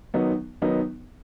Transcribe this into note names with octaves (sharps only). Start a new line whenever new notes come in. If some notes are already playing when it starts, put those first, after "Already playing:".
D#3 F#3 B3 D#4
D#3 F#3 B3 D#4